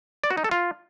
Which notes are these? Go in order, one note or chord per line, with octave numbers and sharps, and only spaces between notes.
D5
F#4
D#4
A4
F4